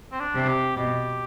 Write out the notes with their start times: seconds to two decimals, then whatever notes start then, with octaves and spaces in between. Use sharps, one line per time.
0.12 C4
0.20 D4
0.35 C3
0.48 G4
0.76 B2 G4